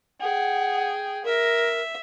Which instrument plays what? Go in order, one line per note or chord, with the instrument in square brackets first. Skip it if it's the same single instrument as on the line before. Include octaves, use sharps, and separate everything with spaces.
[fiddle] G#4 G5 [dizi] F#5
[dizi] A#4 [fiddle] E5